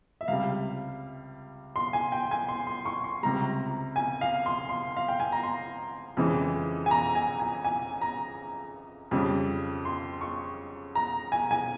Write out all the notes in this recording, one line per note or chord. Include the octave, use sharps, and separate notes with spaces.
E5
C#2 C3 G3 F5
C6
G#5
G5
G#5
C6
C6
C#6
C6
C#2 C3 G3 A#5
G#5
F5
C6
C6
F5
G5
G#5
A#5
C6
F2 C#3 E3 G#3
G#5
A#5
G#5
G#5
G#5
A#5
F2 C#3 G3
C6
C#6
A#5
G#5
G#5